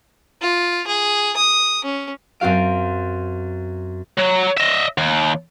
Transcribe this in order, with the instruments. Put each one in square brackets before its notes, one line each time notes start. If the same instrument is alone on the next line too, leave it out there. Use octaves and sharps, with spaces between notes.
[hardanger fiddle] F4
G#4
D#6
C#4
[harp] F#2 C4 F#4 F5 D7
[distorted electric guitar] F#3
D#5 E5
D#2